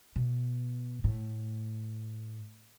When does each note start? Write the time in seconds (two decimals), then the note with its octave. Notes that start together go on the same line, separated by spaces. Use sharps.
0.16 B2
1.04 A2